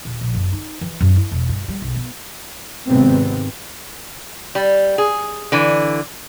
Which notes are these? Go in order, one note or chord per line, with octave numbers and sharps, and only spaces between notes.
D#1
A#1
F#1
D#4
E3
F#2
E4
E1
G2
G3
B1
B3
G#1 C3 B3 C4
G3
G#4
D3 E3